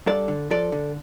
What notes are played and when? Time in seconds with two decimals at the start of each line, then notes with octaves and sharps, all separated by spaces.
0.06 G2 A4 D5
0.28 D3
0.51 F3 A4 D5
0.72 D3